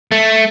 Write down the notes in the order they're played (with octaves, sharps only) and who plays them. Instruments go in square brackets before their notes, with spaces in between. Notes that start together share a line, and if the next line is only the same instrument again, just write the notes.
[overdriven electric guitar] A3